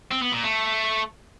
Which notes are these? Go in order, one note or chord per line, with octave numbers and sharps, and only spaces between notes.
C4
B3
A#2
A3